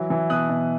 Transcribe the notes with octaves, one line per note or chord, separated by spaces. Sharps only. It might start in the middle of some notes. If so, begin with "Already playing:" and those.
Already playing: E3 F#3
E3
B2 D#6 F#6
B2